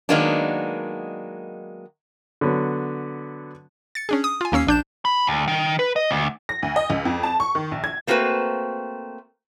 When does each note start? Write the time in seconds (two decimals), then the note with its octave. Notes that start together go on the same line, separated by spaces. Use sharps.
0.09 D#3 F#3 G#3 A#3 B3 D4
2.41 D3 F#3 B3
3.95 A6 C#7
4.09 C#4 D4 G#4
4.24 D#6
4.41 F4 G#5
4.52 D#2 A#3 C#4 E6 C7
4.67 A#1 D4 G6 E7
5.05 B5
5.27 D2
5.48 D#3
5.79 B4
5.96 D#5
6.11 D2
6.49 A#6
6.63 D2
6.76 D#5
6.90 C#2
7.05 F2
7.23 A5
7.40 C#6
7.55 D#3
7.71 A#1
7.84 G#6
8.07 A3 A#3 C4 F#4 B4